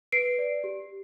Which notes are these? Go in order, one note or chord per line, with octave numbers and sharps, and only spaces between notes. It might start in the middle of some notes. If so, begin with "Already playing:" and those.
B4 C7 D7
D5
G4